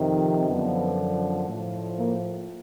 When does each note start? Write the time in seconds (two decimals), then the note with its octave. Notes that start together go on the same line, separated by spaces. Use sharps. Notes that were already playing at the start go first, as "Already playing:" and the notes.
Already playing: F2 C3 D#3
0.49 F#2 D3 F3 B3
1.48 A2 F3
1.98 A#3